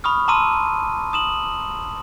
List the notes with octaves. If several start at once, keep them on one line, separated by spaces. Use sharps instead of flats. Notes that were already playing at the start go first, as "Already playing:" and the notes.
B5 C#6 D#6 F6
A5 A#5 C6 D6 E6 D#7
D#6 E7 F#7